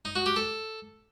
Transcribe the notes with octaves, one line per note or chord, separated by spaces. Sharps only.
D#4
F#4
G4
A4